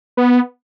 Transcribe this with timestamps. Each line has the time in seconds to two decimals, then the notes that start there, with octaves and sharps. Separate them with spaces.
0.17 B3